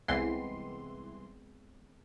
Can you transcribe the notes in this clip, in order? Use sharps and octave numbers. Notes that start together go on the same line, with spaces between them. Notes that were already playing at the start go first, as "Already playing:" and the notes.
C2 E3 G#3 B3 C4 C6